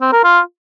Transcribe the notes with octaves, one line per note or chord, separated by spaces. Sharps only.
C4
A#4
F4